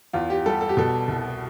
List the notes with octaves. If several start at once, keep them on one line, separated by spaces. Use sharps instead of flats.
E2 F4
G4
G3 A4
A4
G4
B2 A4
C2